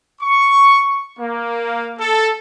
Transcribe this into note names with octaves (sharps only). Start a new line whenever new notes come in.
C#6
A#3
A4